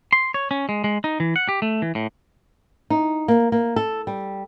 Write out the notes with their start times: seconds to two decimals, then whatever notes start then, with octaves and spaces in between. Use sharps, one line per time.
0.13 C6
0.34 C#5
0.51 C#4
0.69 G#3
0.84 G#3
1.04 D#4
1.20 E3
1.36 F#5
1.49 G4
1.62 A3
1.82 E3
1.95 A2
2.90 D#4
3.28 A#3
3.52 A#3
3.76 A4
4.07 G3